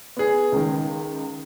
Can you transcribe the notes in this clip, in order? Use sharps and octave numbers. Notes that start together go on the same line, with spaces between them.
B3 G#4
C#2 D#3